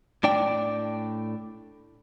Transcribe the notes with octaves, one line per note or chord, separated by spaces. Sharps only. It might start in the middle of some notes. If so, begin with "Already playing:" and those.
A2 D4 D5 G5